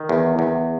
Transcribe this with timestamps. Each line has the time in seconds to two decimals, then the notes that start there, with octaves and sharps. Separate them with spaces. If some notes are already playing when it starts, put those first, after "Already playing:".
Already playing: D#3
0.09 E2
0.39 E2